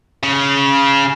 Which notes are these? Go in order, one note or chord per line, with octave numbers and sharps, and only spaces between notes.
C#3